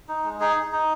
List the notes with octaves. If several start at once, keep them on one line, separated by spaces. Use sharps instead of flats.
D#4
G#3
D#4 G#4
D#4
D#4